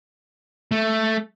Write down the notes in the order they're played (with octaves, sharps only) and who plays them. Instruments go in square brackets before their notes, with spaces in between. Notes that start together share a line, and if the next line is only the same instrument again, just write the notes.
[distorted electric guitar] A3